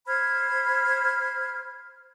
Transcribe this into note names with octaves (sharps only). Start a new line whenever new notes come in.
C5 B5 F6 G#6